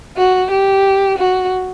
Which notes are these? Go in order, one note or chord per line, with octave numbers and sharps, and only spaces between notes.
F#4
G4
F#4